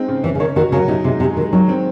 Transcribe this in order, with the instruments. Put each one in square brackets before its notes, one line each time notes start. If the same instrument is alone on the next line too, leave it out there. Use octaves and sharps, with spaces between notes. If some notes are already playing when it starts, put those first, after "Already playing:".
Already playing: [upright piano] G#3 C4 D#4
C#3
[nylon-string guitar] E3 [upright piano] C#4
[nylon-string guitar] C#3
[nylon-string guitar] D#3 [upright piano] C#5
[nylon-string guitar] D#3 [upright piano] F#4
[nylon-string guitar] C#3 [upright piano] F#3
[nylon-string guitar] C3 [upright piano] D#4
[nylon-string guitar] C3 [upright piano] G#3
[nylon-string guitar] C3 [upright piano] G#4
[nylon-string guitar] D#3 [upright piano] G#3
[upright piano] D#3 [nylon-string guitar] F#3
[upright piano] C4